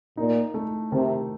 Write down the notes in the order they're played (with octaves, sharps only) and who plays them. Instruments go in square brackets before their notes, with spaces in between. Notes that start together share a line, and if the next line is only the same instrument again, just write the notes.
[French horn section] A#2 [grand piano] D#4
[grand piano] A3
[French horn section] C3 [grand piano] D#3